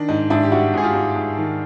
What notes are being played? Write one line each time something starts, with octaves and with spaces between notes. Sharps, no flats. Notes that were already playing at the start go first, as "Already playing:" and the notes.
Already playing: D#3 D4
G#2 D#4
G#2 D4 E4
G4
G3 E4 F#4
G#2 G#4
F4 G4
G#2
G#2
D#3